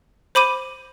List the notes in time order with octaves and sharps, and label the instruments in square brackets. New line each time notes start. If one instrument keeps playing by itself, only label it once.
[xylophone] C5 B5 D6 D#7